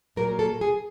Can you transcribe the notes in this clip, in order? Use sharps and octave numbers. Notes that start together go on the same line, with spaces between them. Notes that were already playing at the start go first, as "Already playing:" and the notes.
A#2 F#3 A#3 A#4
A4
G#4